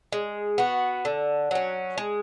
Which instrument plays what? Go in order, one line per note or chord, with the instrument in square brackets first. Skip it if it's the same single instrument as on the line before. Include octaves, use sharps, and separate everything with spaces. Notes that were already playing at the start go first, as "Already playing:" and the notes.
[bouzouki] G#3
B3 F#4
D3
F#3 C#4
G#3